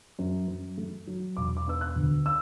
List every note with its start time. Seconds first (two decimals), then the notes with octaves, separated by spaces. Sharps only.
0.19 F#2
0.48 F#2
0.78 A3
1.07 F#3
1.37 E1 D6
1.57 D6
1.67 B3 E6
1.81 F#6
1.96 D2
2.26 E6